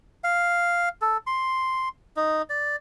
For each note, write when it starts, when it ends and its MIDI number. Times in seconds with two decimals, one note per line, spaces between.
0.24 0.89 77
1.01 1.17 69
1.27 1.89 84
2.16 2.42 63
2.50 2.76 74